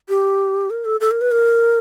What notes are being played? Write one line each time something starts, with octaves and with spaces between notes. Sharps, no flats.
G4
A#4
A4
A4
A#4
B4
A#4